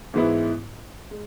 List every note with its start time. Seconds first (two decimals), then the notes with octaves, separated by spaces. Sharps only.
0.14 G#2 E3 G#3 B3 E4
1.11 G#3